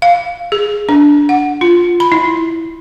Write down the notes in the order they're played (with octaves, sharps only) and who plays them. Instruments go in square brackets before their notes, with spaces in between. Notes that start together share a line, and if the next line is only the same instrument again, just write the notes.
[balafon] F5
G#4
D4
F#5
F4
B5
E4